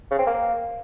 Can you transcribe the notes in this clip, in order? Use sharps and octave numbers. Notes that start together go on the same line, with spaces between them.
C#3
C4
A#3